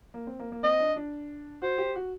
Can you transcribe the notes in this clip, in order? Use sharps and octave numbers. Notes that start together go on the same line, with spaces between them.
A#3
C4
A#3
A#3
C4 D#5
D4
D4
F#4 C5
G4
F#4